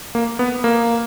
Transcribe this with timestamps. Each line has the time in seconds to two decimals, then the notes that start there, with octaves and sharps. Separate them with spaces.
0.15 A#3
0.39 B3
0.64 A#3